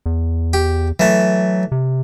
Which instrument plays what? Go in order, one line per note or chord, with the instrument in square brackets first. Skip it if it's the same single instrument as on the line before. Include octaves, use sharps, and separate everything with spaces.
[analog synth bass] E2
[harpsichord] G4
[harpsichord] E3 A3 [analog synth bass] F#3
[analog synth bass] C3